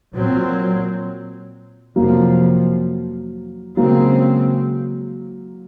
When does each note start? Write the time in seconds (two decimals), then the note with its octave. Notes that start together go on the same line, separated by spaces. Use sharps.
0.14 A#2 F#3 C4
1.96 F2 C3 F3 F#3 A#3
3.77 C#3 F#3 G#3 A#3 C4